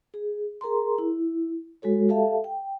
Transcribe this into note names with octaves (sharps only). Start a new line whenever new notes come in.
G#4
G#4 A#4 A#5 C6
E4
G#3 F#4 A4 C#5
G4 A4 E5 F5 A5
G5